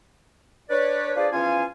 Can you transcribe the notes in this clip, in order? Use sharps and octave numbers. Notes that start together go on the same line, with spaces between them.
D4 B4 C#5 D5
D4 F4 G#4 B4 C5 D5
E2 F3 C#4 F4 F5 G#5